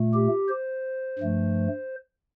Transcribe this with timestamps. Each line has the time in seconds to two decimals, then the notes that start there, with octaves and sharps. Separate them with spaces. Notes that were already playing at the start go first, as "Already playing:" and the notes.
Already playing: A#2 A3
0.14 G4
0.49 C5
1.19 G2 F3 A3